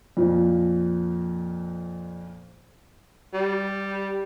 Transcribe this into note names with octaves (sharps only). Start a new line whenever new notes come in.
F2 A#2 F3
G3